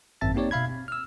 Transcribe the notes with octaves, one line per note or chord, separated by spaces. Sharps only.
G#1 F#2 C4 E5 A5 A6
A#3 C4 D#4 G4 C#5 D5
B2 E5 F5 B5 G#6
C4
E6 F6